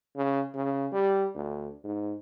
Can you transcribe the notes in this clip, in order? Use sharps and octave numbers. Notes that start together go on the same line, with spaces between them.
C#3
C#3
G3
D2
G#2